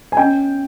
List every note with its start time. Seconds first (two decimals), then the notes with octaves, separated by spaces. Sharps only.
0.12 G#5
0.17 C#4 G5